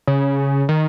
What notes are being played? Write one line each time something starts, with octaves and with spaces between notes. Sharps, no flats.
C#3
D#3